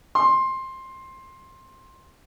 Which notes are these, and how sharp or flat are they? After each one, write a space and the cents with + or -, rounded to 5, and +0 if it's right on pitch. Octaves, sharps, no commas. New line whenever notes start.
C6 +15